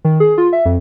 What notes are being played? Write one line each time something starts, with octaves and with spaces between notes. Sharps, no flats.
D#3
G#4
F4
E5
F2